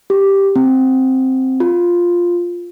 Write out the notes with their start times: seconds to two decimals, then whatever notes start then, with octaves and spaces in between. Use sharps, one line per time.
0.10 G4
0.56 C4
1.60 F4